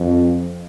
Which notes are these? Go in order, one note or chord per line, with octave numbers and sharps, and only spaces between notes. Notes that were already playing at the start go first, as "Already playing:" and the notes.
Already playing: F2